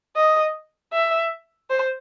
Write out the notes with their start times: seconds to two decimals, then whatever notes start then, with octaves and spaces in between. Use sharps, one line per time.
0.16 D#5
0.93 E5
1.70 C5